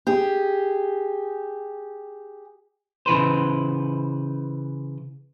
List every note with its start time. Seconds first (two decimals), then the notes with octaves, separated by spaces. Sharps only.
0.07 G4 G#4
3.06 C#3 E3 B4 C5